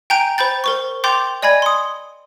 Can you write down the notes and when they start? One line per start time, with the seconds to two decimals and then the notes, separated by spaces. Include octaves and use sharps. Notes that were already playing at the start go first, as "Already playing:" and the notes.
0.10 G5 G#5 A#5 G6 D7
0.38 C5 B5 G6 A6
0.64 A#4 C5 C#6
1.04 G5 C6 D6 G6 A6 F7
1.42 D5 D#5 G#5 B5 G#6
1.62 C6 D#6